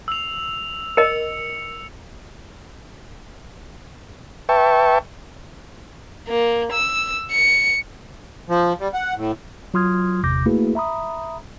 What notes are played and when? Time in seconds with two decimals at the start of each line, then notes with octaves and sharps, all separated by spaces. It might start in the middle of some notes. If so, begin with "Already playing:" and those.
0.08 E6 F7
0.97 A#4 D#5 C#7
4.49 B4 E5 G5 A5 C#6
6.28 A#3
6.73 E6
7.32 C#7
8.49 F3
8.80 G3
8.94 F#5
9.16 A2
9.74 F#3 F4 C6 D#6 F6 G#6
10.24 G1 E2 C3 D6 G6 A#6
10.46 A3 A#3 E4 F#4 G#4 B4
10.75 E5 A#5 B5 D#6